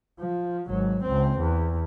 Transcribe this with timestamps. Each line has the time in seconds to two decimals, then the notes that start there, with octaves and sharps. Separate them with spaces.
0.20 F3
0.69 G#1 F#3
1.03 C#2 C4
1.38 E2